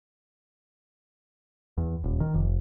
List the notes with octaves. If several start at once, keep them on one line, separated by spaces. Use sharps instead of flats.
E2
D#1
D#3
F1